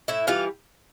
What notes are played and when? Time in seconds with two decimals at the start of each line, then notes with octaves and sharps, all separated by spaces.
0.08 A2 E4 E5
0.27 E3 G3 F4 F5